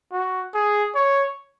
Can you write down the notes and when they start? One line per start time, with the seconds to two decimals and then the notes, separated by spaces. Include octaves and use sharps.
0.12 F#4
0.54 G#4
0.95 C#5